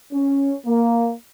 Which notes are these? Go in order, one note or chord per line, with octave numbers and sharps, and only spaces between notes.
C#4
A#3